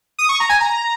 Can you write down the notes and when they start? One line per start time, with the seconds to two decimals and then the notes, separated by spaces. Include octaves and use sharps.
0.19 D#6
0.29 C#6
0.40 A#5
0.49 G#5
0.61 A#5